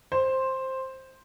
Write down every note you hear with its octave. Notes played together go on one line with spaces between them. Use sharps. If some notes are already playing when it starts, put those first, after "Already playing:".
C5